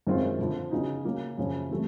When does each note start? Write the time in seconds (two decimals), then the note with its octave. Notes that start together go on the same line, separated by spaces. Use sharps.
0.07 F#2 D#3 G#3 C4 F4
0.39 F2 D3 F3
0.71 C#3 F#3 B3 D#4
1.05 C#3 F#3 A#3 C#4
1.38 F#2 C#3 F3
1.70 C3 E3 A3